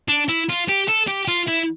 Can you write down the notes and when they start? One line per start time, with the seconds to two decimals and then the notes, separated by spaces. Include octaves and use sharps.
0.09 D4
0.29 E4
0.49 F4
0.68 G4
0.89 A4
1.08 G4
1.28 F4
1.48 E4